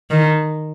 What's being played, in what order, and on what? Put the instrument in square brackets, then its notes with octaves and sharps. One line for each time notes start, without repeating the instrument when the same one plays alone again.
[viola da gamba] D#3